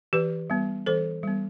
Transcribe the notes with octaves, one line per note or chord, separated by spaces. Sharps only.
E3 G4 B4
G3 B3
E3 A4 C5
G3 B3